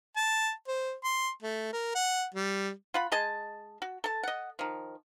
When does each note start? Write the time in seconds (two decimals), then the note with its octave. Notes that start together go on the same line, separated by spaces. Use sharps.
0.16 A5
0.68 C5
1.04 C6
1.42 A3
1.73 A#4
1.95 F#5
2.34 G3
2.94 F4 F#5 B5
3.12 G#3 G#4 D#5 A5
3.82 F#4
4.04 A4 A5
4.23 D#5 F#5
4.59 D#3 F3